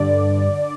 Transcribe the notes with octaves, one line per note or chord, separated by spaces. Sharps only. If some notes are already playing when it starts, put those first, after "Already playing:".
Already playing: G2 D3 D5
D3